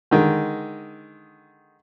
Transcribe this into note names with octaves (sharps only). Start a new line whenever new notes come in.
D3 D#3 G#3